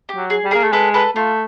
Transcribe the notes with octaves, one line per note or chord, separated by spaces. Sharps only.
G4
F#3
G#4
G3
A#3 G#4 A#4
A3
G#3 A4 B4
A4 B4
A3 F4